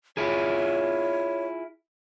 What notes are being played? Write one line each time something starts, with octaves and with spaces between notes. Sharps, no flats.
E4 F4 G#4 C#5